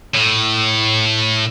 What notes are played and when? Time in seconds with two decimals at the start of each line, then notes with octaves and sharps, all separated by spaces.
0.14 A2